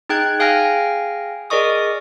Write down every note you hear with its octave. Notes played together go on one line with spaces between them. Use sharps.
D#4 G#4 G5 F#6 G#6
G#4 F5 G5 G#5 F6 A#6
G#4 A#4 D5 D#5 C#6 D#6